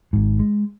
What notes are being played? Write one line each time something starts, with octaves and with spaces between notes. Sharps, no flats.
G#1 G#2
G#3